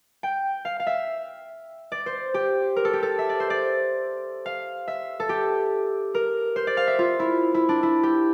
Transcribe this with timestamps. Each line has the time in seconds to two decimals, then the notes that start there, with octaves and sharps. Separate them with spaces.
0.23 G5
0.65 F5
0.80 F5
0.87 E5
1.92 D5
2.06 C5
2.34 G4
2.76 A#4
2.85 A4
2.93 G4
3.03 A4
3.19 E5
3.29 D5
3.40 C5
3.50 D5
4.46 F5
4.88 E5
5.20 A4
5.29 G4
6.15 A#4
6.56 C5
6.67 D5
6.77 F5
6.87 E5
6.99 F4
7.19 E4
7.54 E4
7.69 D4
7.83 E4
8.03 G4